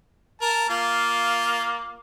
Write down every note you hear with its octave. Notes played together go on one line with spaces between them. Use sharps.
A#4 A5
A#3 F4